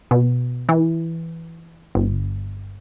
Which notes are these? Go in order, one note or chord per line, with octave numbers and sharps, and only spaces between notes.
B2
E3
G1